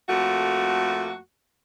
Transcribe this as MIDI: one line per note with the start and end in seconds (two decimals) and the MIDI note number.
0.09 1.18 41
0.09 1.18 57
0.09 1.18 58
0.09 1.18 66